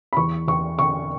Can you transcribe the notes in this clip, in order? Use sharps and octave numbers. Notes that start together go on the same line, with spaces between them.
B5
E2 C#6
E2 C#6
D3 C#6